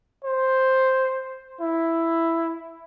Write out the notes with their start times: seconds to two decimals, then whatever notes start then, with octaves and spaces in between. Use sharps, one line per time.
0.24 C5
1.61 E4